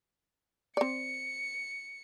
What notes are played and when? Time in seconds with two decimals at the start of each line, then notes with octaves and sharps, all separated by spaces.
0.77 C4 D5 C#7